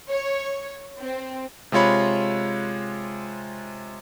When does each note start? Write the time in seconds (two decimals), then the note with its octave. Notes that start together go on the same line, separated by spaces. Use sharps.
0.10 C#5
1.00 C4
1.72 C3 G#3 F4 C#5 B5